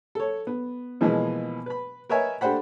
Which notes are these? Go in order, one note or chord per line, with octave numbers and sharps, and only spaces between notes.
A4 C#5
B3
B2 E3 F3 G#3 A#3 B3
B4 B5
A#4 B4 C#5 D#5 E5 G#5
A3 D4 G4 C5 F#5 B5